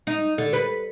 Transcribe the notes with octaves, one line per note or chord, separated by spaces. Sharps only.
D#4
D3
B4